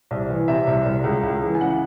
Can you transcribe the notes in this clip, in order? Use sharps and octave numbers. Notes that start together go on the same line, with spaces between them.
C2
E3
C3 E5
C2
C2
C#2
C#2
E3
G#5
C#3 F#5